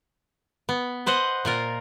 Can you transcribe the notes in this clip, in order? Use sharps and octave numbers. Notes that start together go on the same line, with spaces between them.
B3
B4 C5 D#5 F#5
A#2 F4 A#4